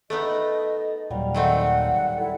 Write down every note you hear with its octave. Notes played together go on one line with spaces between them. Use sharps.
A3 B3 D#4 A4 D#5
D#2 A#2 F#3 G3 F5
D#3 A3 C4 F#5
E4 A4